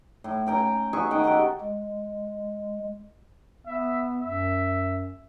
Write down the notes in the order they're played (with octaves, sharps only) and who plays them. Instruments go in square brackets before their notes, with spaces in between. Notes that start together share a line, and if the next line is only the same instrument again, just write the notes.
[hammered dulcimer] A2
C#4 G5 A#5
F#4 G#4 E5 C#6
D#3 F#5 G5
F#4 G4 A4 G5
[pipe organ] G#3
[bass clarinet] B3 [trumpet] E5
[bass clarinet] F#2 [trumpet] E5